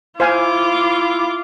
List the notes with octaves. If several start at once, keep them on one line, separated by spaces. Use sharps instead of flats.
E4 F4 C5 F5 G#5 D6